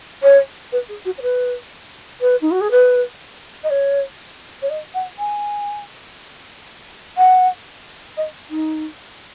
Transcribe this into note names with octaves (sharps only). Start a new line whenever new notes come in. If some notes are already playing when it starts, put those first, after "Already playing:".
C#5
B4
G#4
F#4
C#5
B4
B4
D#4
F#4
G#4
B4
D#5
C#5
C#5
D#5
F#5
G#5
F#5
D#5
D#4